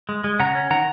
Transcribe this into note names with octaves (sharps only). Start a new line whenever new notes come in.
G#3
G#3
C#3 F#5 A#5
C#4
D#3 F#5 A#5